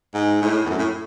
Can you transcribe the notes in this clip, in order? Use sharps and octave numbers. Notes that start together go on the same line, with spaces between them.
G#2
A2
E2
F#2
A2